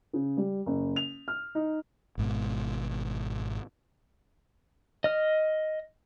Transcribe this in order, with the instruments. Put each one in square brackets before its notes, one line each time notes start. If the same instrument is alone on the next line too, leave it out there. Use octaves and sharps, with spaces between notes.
[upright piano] C#3
G3
F#1
F7
F6
D#4
[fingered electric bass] G#1 G#2 B2
[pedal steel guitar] D#5 F6